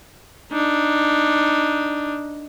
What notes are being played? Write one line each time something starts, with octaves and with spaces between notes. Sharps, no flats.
D4 D#4